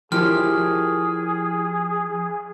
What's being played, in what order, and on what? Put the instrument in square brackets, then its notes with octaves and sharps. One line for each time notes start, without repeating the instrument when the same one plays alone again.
[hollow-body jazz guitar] F3 G4 C#5 [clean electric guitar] E4 A#4 G5 [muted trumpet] G#4 [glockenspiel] F6